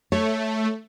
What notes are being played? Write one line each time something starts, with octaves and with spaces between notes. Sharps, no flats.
A3 C#5